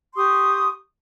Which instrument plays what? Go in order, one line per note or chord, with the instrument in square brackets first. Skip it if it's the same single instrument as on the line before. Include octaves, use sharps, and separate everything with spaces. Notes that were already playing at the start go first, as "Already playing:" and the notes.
[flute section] G4 C6 C#6 D#6